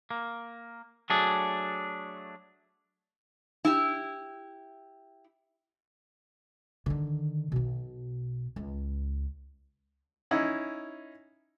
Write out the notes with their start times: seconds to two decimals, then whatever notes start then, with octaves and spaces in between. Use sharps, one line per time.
0.11 A#3
1.10 F#3 A3 D4 G#4
3.65 E4 G4
6.86 D3 D#3
7.52 B1 B2
8.56 C#2
10.31 C#4 D#4 E4